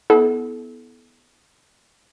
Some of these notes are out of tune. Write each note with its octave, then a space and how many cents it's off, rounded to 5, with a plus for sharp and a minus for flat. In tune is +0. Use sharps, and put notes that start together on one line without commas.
B3 +0 E4 -30 A4 -30